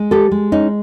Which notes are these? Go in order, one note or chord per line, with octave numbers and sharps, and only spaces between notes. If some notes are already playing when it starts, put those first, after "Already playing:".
Already playing: G#3
G4 A4
G#3
C#4 D#4